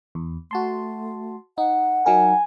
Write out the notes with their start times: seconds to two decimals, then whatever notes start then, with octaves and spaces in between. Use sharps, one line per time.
0.15 E2
0.51 A3 F#4 A5 C6
1.58 D#4 F#5
2.06 F#3 D#4 A#4 G#5